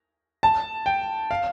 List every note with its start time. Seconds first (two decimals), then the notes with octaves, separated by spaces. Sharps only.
0.43 A5
0.86 G5
1.31 F5